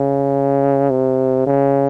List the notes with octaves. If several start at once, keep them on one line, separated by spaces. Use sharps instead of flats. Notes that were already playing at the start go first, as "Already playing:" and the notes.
Already playing: C#3
C3
C#3